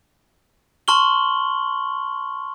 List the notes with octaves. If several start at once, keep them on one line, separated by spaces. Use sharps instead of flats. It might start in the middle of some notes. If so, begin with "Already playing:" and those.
A5 C6 C#6 F6 F#7 G7